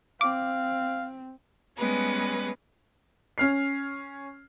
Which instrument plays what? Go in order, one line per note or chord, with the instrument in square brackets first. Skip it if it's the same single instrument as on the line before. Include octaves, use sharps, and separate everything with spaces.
[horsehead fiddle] C4 [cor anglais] F5 [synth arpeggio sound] D6
[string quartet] G3 G#3 B3 C#4 B4 A#6
[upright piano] C#4 F6 C7